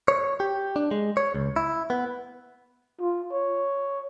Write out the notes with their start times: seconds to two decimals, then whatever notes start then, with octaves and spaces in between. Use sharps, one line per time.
0.08 C#5
0.40 G4
0.76 D4
0.91 G#3
1.17 C#5
1.34 C#2
1.56 E4
1.90 B3
3.00 F4
3.32 C#5